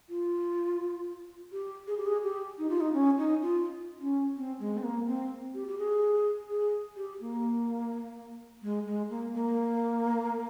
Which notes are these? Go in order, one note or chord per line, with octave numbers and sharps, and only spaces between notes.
F4
G4
G#4
G4
G#4
G4
D#4
F4
D#4
C#4
D#4
F4
C#4
C4
G#3
C4
A#3
C4
G4
G4
G#4
G#4
G4
A#3
G#3
G#3
A#3
A#3